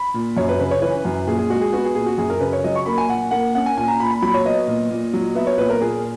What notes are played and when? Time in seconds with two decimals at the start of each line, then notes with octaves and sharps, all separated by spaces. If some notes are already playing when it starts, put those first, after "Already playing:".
Already playing: B5
0.14 A#2
0.37 F#2 C#5
0.49 B4
0.60 C#3 B4
0.71 C#5
0.82 E3 B4
1.05 F#2
1.27 A#2 G#4
1.38 G#4
1.50 G#3 F#4
1.61 G#4
1.73 B3 F#4
1.85 G#4
1.95 A#2 G#4
2.06 F#4
2.18 F#2 G#4
2.30 A#4
2.40 C#3 B4
2.53 C#5
2.64 F#3 D#5
2.75 C#6
2.86 A#3 B5
2.98 G#5
3.09 A#2 F#5
3.31 A#3 F#5
3.55 C#4 F#5
3.66 G#5
3.77 A#2 G#5
3.88 A#5
4.00 A#2 B5
4.11 B5
4.22 F#3 B5
4.34 C#5
4.44 B3 D#5
4.67 A#2
4.91 A#2
5.14 F#3
5.35 B3 E5
5.47 C#5
5.58 A#2 B4
5.70 A#4
5.80 A#2 G#4